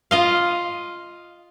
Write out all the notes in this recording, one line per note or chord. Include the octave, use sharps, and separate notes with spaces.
F4 D#5 F5